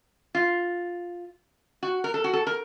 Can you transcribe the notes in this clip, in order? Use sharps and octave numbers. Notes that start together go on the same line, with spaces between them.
F4
F#4
A#4
A4
F#4
A4
A#4